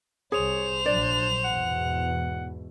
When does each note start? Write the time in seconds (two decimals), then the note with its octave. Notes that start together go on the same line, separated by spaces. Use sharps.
0.32 C2 G#4 C5 C#5 F7
0.86 A#1 F#3 D4 D5
1.44 E2 G#2 B2 F#5